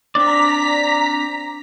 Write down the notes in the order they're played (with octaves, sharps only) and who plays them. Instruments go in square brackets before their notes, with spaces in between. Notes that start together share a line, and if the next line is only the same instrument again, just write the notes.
[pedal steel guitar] C4 D4 D5 [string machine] A#5 B6